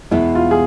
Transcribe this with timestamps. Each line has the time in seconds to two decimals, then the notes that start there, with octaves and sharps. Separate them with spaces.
0.11 E2 B2 G#3 B3 E4
0.35 F4
0.51 G#4